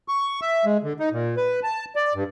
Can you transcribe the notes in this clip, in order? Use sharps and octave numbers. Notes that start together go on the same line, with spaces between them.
C#6
E5
G#3
D3
D#4
A#2
B4
A5
D5
G2